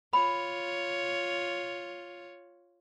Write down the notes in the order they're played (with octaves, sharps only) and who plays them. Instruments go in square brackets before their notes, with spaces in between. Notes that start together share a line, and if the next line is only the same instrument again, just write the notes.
[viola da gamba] F4 C#5 [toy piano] B5